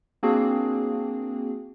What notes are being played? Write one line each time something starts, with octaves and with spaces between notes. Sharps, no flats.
A#3 C4 D4 F#4 G#4